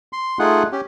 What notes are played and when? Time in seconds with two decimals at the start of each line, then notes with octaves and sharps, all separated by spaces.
0.13 C6
0.39 A3 D#4 F4 G#4 F#5
0.72 C#4 G4